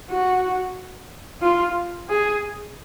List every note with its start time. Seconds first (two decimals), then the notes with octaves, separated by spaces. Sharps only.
0.10 F#4
1.42 F4
2.09 G#4